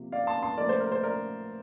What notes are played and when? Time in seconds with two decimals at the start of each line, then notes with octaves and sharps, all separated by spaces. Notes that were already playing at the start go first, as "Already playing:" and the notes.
Already playing: C3 F3 A#3
0.12 D5 F5
0.27 A5 C6
0.42 A5 C6
0.58 A#2 F3 A3 A#4 D5
0.69 C5
0.81 A#4
0.92 C5
1.04 A#4 D5